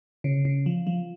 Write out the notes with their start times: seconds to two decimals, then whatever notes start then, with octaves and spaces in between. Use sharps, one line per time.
0.24 C#3
0.45 C#3
0.66 F3
0.87 F3